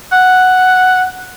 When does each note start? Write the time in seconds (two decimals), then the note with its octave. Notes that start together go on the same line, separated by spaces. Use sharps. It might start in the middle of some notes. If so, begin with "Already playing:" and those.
0.12 F#5